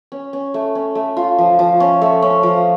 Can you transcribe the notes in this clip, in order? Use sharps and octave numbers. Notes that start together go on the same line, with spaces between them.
C#4
C#4
A3
C#4
A3
F4
F3
F3
C#4
A3
C#4
F3